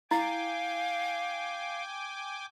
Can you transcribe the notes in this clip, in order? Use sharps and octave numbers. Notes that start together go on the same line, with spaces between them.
E4 F5 G5 G#5 D6